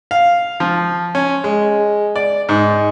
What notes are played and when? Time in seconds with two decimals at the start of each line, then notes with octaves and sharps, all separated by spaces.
0.11 F5
0.60 F3
1.15 C#4
1.44 G#3
2.16 D5
2.49 G#2